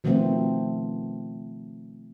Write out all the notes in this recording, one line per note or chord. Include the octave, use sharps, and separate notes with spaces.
B2 D#3 F3 A3 B3 C4